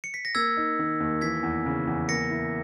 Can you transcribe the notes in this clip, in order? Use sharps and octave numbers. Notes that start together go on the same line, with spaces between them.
C#7
B6
A#6
A#3 E6 G#6
D#4
D#3
D#2
E3 G#6 B6
E2
C#3
E2
A#3 A#6 C#7
E4